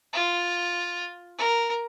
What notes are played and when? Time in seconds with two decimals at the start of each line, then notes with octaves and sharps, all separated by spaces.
0.13 F4
1.38 A#4